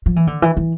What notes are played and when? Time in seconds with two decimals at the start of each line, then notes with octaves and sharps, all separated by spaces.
0.06 F3
0.16 E3
0.27 D3
0.42 E3
0.57 E3